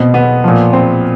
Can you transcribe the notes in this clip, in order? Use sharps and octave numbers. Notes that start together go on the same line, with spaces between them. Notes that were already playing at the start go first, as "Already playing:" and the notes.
Already playing: B2 C4
B3
A#2 F3
C4